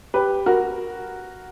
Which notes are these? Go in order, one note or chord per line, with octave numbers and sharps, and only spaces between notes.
G4 B4
F#4 A#4